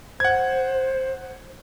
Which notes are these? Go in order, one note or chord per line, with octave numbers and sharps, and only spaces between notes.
C5 F#5 G#6